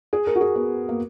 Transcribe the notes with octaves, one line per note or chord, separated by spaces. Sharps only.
G#4
A#4
F#4
G#4
B3
A#3